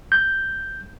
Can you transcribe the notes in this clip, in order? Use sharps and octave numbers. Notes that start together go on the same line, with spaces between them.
G6